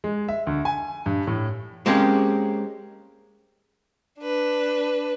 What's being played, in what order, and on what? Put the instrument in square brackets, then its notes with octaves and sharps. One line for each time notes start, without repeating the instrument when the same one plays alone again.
[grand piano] G#3
E5
D2
G#5
G2
A2
[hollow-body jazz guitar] G#3 A#3 C4 C#4 G4
[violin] D4 B4